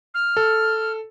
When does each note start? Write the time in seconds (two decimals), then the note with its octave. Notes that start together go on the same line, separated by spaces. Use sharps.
0.14 F6
0.37 A4